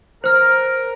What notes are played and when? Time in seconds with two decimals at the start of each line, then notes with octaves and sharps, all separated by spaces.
0.24 A#4 C5 F6